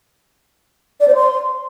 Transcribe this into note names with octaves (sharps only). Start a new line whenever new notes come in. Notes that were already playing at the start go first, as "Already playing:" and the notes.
D5
C5
C6